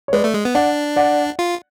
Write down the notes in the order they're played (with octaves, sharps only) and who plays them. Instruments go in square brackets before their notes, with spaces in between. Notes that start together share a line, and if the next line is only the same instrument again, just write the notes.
[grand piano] C#5
[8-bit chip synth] G#3 [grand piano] B4 D5
[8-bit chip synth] A3
G#3
B3
[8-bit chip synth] D4 [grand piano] D5 F#5
[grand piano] D5 F#5
[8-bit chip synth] F4